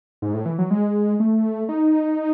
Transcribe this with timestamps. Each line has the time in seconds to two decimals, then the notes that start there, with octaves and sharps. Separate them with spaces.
0.22 G#2
0.34 A2
0.46 E3
0.58 F#3
0.71 G#3
1.20 A3
1.69 D#4